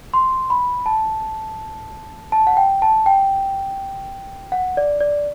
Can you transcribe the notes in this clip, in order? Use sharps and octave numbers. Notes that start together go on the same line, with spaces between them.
C6
B5
A5
A5
F#5
G5
A5
G5
F#5
D5
D5